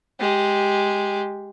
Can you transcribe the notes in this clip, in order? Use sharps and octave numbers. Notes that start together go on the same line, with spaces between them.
G#3 G4